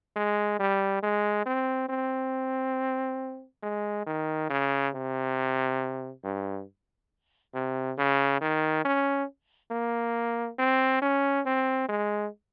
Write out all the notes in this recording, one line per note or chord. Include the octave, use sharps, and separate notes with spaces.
G#3
G3
G#3
C4
C4
G#3
D#3
C#3
C3
G2
C3
C#3
D#3
C#4
A#3
C4
C#4
C4
G#3